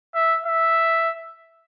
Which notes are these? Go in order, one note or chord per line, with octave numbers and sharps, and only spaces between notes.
E5
E5